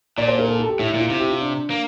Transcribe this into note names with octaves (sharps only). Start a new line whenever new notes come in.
A#2 D5
C5
A#4
A4
A4
G4
A2 E4
A#2 E4
F4
C3 E4
G4
F4
D4
A#3